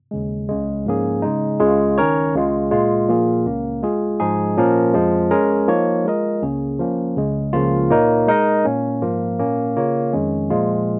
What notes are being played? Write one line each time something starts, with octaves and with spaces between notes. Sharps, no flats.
D#2 C#3 G#3
C#2 C#3 G#3
G#2 F3 A#3 C#4 G#4
C#3 G#3 D#4
C#2 C#3 G#3 F4 G#4
D#3 C#4 A#4 C#5
C#2 C#3 G#3 F4
A#2 G#3 F4
A#2 F3 A#3 F4 G#4
C#2 C#3 A#3 C#4
G#3 F4 G#4
G#2 F3 G#3 D#4 G#4
A#2 F3 A#3 C#4 A#4
F2 F3 G#3
G#3 C#4 A#4 D#5
F3 A#3 D#4 C#5
G#3 F4 A#4 D#5
C#2 C#3 A#3 C#4 G#4
F3 A#3 C#4
C#2 C#3 G#3
C#2 C#3 F3 A#3 F4
A#2 A#3 D#4 A#4 C#5
G#3 D#4 A#4 D#5
A#2 A#3 C#4
G#2 F3 A#3 F4
A#2 A#3 C#4
C#3 A#3 F4 C#5
F2 D#3 G#3 C#4
A#2 F3 G#3 F4